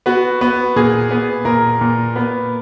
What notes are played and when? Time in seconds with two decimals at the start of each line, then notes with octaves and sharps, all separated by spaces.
0.06 B3 F#4
0.41 B3
0.76 A#2 G#4
1.11 B3
1.45 A#2 A#4
1.81 A#2
2.16 B3